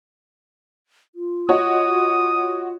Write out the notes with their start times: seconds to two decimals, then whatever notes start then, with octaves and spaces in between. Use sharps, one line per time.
1.15 F4
1.49 F#4 C#5 D#5 D#6